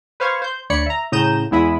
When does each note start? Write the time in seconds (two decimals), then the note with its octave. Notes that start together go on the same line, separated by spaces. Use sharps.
0.20 B4 C5 F5 C#6 G#6
0.42 C5 G6
0.70 D2 C#5 D5 B5 C#7
0.86 E5 A#5
1.12 A2 C#3 A#5 D#6 G6 E7
1.51 E2 G#3 E4 E5 B5 D#6